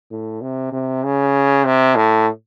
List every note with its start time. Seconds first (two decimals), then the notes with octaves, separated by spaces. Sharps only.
0.11 A2
0.42 C3
0.72 C3
1.04 C#3
1.65 C3
1.96 A2